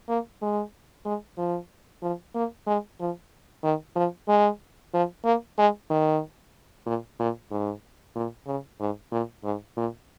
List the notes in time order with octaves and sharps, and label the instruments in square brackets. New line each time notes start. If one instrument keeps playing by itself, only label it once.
[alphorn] A#3
G#3
G#3
F3
F3
A#3
G#3
F3
D#3
F3
G#3
F3
A#3
G#3
D#3
A#2
A#2
G#2
A#2
C#3
G#2
A#2
G#2
A#2